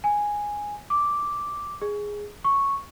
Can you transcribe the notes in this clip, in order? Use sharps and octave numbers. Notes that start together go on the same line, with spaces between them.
G#5
D6
G#4
C#6